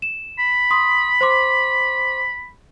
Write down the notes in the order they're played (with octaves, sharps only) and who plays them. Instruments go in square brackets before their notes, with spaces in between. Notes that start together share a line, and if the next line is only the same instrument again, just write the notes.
[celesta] E7
[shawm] B5
[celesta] C6 D#6
C5 C6 D6